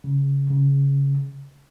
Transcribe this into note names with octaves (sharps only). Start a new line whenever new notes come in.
C#3
C#3